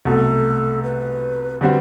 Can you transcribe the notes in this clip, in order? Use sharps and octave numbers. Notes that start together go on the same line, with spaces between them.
C2 B2 F#3 A3 A4
B4
D3 G3 C4 F#4 B4 D5